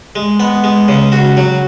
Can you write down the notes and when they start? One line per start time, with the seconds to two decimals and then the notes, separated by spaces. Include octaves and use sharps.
0.16 G#3
0.40 B3
0.64 G#3
0.88 C#3
1.12 F#4
1.37 F#3